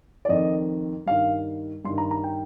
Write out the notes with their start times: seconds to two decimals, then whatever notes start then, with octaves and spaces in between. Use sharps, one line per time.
0.25 D5
0.29 F2 D#3 D#5
1.06 G2 D#3 F5
1.85 G2 C6
1.90 D#3
1.98 A#5
2.11 A#5
2.24 G5